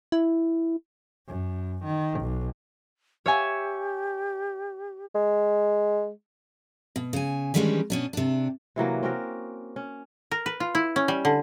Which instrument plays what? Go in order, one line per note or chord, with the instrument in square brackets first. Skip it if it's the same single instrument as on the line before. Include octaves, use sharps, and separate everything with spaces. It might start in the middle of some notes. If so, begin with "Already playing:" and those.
[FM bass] E4
[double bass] F#2
D#3
B1
[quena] G4 [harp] C#5 E5 G#5
[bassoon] G#3
[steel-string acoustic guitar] B2
C#3 G#5
D#3 E3 G3 G#3 C#4 D4
B2 C#4 D4
C3 D4
[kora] C3 E3 F#3 A#3
C4 C#4 F#4 A#4
C#4
[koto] A#4
B4
F4
E4
C#4
G3
D3